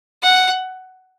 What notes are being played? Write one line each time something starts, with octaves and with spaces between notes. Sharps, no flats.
F#5